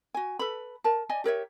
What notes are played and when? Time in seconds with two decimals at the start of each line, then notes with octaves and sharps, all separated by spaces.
0.14 F#4 G#5
0.39 A4 B4 B5
0.84 A#4 A5
1.09 D5 D#5 G#5
1.24 G4 A#4 C#5 E5